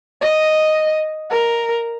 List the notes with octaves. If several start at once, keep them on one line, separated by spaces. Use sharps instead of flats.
D#5
A#4